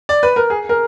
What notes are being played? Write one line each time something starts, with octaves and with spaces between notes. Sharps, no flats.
D5
B4
A#4
G#4
A#4